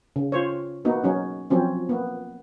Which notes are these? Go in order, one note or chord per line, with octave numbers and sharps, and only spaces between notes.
C#3
F4 C5 C#5
A#3 B3 D#4 F#4
F#3 C#4 D#4
F3 F#3 C4 C#4
A#3 B3